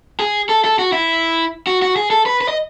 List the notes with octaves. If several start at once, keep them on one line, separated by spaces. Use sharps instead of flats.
G#4
A4
A4
F#4
E4
F#4
F#4
G#4
A4
B4
B4
D#5